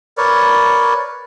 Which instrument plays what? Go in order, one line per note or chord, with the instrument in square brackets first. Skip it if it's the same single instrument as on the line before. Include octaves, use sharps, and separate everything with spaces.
[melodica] A#4 B4 C#5 D5